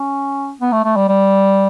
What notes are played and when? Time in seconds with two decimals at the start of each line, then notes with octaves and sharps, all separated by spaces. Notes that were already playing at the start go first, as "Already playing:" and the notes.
Already playing: C#4
0.61 B3
0.72 A3
0.84 A3
0.96 G3
1.08 G3